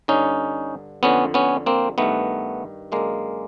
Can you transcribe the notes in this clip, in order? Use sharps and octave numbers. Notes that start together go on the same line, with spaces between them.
G2 D3 C#4 D#4
F2 D3 B3 C#4
B3 C#4
A#3 C4
G2 D#3 A3 B3
F#2 D3 G#3 A#3